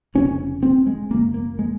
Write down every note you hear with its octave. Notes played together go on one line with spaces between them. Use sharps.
F1 F2 C#3 C#4
C4
G#3
F#1 F#2 C#3 A#3
A#3
G#3